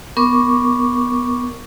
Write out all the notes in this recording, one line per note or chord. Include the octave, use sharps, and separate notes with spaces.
B3 A#4 C#6 D6